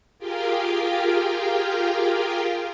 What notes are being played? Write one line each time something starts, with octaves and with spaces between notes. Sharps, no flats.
F4 G4 G#4 A#4 F5 G5